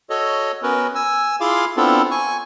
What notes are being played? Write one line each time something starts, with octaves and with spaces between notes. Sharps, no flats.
F#4 A4 C#5 D#5
B3 C#4 F#4 A#4 B4
G#5 E6
E4 F4 G#4 F5 C6 D6
B3 C4 D4 E4 F4 A4
G#5 C#6